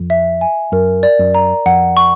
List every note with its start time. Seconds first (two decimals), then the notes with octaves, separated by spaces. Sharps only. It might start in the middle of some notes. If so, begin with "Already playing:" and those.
Already playing: F2
0.10 E5
0.41 G#5
0.72 F#2 A#4
1.03 D5
1.19 F#2
1.35 A#5
1.66 F2 F#5
1.97 C#6